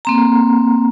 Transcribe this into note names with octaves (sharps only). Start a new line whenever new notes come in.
A#3 C4 A#5